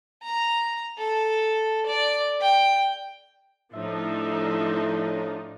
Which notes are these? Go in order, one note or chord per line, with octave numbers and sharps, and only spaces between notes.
A#5
A4
D5
G5
A2 F3 D4 D#4 E5